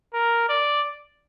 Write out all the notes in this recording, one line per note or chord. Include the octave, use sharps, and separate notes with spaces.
A#4
D5